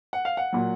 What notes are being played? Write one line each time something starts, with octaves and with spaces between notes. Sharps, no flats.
F#5
F5
F#5
A#2 F#3